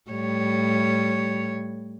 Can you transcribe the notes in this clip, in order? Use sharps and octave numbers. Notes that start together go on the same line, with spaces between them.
A2 G3 C#5